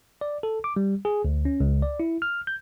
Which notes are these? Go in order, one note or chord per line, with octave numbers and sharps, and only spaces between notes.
D5
A4
D6
G3
G#4
D2
C#4
C#2
D5
E4
F6
G6